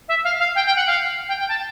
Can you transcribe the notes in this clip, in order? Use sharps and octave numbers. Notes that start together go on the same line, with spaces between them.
E5
F5
F5
G5
G5
F#5
F5
G5
G5
A5